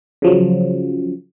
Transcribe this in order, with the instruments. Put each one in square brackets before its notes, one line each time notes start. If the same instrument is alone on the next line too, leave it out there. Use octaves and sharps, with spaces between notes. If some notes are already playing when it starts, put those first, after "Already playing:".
[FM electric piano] C#3 F3 F#3